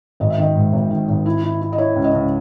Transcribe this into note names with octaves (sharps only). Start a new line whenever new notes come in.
G#1 D#5
E5
D#3 D#5
G#2
G#1
D#3
G#1
E4
E4
E4
D#5
E4 C#5
C#2
D#5
C#2